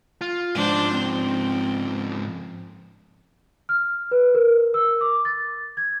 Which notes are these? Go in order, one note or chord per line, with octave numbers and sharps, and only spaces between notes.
F4
G#2 F3 D4 C5
C4
F6
B4
A#4
E6
D6
A6
G#6